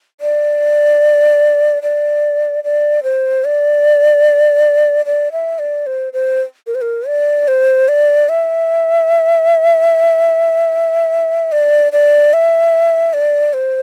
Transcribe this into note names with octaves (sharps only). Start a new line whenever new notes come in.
D5
D5
D5
C5
D5
D5
E5
D5
C5
C5
A#4
C5
A#4
D5
C5
D5
E5
D5
D5
E5
D5
C5